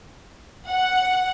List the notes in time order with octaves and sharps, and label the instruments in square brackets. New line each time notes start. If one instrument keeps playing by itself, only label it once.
[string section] F#5